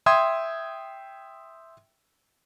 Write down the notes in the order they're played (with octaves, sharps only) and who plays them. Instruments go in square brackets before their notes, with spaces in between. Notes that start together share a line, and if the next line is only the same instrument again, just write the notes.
[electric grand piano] E5 G5 C6 D#6 G#6